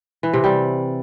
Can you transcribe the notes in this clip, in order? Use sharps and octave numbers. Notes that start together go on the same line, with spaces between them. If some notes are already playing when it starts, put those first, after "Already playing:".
E3
C3
G3